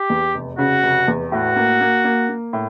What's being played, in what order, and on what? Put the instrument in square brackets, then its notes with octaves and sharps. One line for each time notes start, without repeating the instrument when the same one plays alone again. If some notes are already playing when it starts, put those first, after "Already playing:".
Already playing: [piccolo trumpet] G4
[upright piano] E2
F1
[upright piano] C#3 [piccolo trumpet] F#4
[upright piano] F1
E2
[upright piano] A2 [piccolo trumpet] F#4
[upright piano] A#3
A#3
A#3
A#3
A2